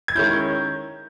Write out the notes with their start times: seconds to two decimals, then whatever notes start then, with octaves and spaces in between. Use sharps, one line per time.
0.08 G#6
0.15 D#3 G#3 C#4 E4 G6